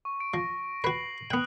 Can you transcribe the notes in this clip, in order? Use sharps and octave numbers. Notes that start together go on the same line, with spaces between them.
C#6
D7
F3 C#6 A#6
F#4 B4 C7 F#7
B3 G5 D#6 F#6 F#7